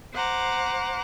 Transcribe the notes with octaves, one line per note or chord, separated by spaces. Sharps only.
C5 F#5 A#5 D6